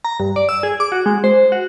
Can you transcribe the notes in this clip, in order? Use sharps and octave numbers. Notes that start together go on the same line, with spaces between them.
A#5
G2
D5
E6
G#4
D6
F#4
G#3
C5
F#4